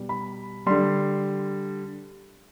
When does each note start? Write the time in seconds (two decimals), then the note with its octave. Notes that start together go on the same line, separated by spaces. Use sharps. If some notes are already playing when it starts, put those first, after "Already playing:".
Already playing: B2 G3
0.09 B5
0.66 D3 G3 C6